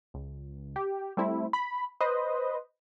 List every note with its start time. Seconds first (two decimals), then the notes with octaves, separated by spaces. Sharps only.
0.14 C#2
0.76 G4
1.17 G3 A3 C4 E4
1.53 B5
2.01 B4 C5 D#5